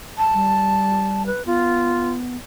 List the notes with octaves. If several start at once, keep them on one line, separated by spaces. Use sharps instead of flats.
A5
G3
B4
B3 F4